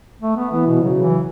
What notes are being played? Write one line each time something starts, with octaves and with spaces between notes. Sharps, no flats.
A3
B3
E3 B3
B2
C#3 F#3
E3